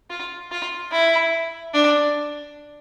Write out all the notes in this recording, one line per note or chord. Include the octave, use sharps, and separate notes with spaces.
F4
F4
E4
D4